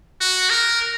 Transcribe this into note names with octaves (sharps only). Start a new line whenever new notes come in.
F#4
A#4